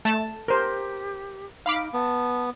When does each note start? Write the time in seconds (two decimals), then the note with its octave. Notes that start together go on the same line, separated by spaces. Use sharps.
0.05 A3 A5
0.48 G4 A#4 C5
1.66 D#4 F5 B5 D6
1.93 B3 A5